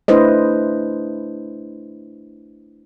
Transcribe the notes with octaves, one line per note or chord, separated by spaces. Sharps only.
A3 D4 E4 B4 C5 D#5